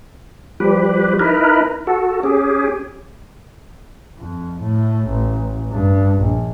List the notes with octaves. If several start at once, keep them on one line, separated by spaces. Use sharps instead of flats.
F3 G3 G4 B4
D#4 E4 A#4 B4
F#4 A4
C#4 G4 G#4
F2
A2
A1
G2
A#1